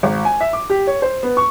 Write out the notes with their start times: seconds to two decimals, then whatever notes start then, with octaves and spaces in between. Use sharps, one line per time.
0.03 G#1
0.25 G#5
0.41 E5
0.53 D6
0.70 G4
0.87 C#5
1.02 C5
1.23 B3
1.37 C#6